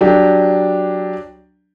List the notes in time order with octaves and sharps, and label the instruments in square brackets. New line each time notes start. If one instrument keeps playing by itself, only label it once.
[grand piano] F#3 D4 G4